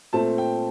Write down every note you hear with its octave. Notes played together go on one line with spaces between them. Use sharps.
A#2 A3 C4 A5
G5